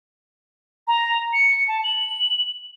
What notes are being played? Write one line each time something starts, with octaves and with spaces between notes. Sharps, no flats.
A#5
C#7
A5
F#7